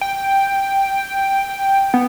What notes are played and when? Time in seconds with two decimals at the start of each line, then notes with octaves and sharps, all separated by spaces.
0.01 G5
1.94 B3